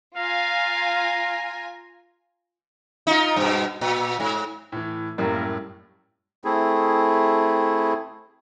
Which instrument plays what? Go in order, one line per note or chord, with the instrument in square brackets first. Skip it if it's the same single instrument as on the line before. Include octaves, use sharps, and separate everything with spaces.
[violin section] F4 G#5 [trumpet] F5 [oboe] A#5
[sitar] D#4 F4
G2 B2
A#2
G#2
[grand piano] A2 E3
[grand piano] F#2 A2 G3 [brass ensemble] A#3 A#4
[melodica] A3 C4 E4 G#4